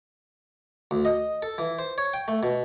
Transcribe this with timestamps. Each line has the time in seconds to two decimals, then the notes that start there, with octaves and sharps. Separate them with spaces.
0.91 D2
1.05 D#5
1.43 A4
1.58 E3
1.79 C5
1.98 C#5
2.14 G5
2.28 A3
2.43 B2